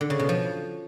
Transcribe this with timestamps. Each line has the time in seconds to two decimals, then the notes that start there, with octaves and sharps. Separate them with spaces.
0.01 D3
0.10 C#3
0.19 B2
0.29 F3